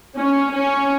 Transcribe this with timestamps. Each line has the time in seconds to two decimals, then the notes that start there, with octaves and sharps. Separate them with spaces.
0.17 C#4
0.54 C#4